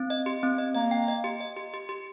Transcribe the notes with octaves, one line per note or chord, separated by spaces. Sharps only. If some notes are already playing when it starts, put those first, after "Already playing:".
Already playing: C4
D#5
G4
C4
D#5
A#3 D#5
G5
D#5
G4
D#5
G4
G4
G4